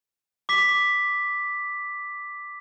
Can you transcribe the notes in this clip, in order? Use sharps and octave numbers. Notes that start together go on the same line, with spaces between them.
D6 B6